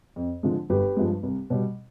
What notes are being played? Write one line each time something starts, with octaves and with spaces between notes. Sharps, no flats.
F2
D3 F3 G#3
G1 G4 B4
G2 F3 G#3
C2
B2 G3